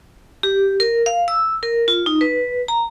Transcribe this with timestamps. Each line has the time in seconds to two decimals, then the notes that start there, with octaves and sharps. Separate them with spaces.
0.43 G4
0.80 A#4
1.06 F5
1.28 E6
1.63 A#4
1.88 F4
2.06 D#4
2.21 B4
2.68 A#5